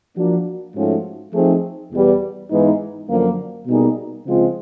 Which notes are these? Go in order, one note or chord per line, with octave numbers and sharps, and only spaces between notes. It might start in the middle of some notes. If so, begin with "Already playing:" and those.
F3 A#3 D4 F#4
G#2 F3 A3 C#4 F#4
F3 A3 C4 D#4 G#4
E2 B2 G3
G#2 E3 G#3 B3 D#4
F#2 D3 F3 A#3
B2 G3 A#3 D#4 G#4
C#3 F3 G#3 C4 F4